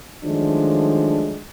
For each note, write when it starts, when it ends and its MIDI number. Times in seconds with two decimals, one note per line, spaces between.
0.24 1.41 51
0.24 1.41 53
0.24 1.41 54
0.24 1.41 56
0.24 1.41 57
0.24 1.41 62